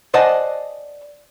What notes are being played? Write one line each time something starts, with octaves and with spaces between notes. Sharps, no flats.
C5 D5 D#5 F#5 G#5 A5